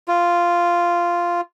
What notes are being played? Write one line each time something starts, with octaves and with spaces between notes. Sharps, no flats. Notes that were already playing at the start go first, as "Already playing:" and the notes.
F4